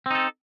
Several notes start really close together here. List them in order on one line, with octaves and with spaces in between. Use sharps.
C4 D#4 A4